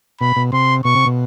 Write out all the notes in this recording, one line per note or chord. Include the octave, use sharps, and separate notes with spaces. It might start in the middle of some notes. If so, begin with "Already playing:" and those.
B2 B5
B2
C3 C6
B2 C#6
C3
B2